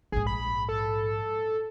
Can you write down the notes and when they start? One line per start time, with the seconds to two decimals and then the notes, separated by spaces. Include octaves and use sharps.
0.12 A#1 G#2 G#4
0.27 B5
0.69 A4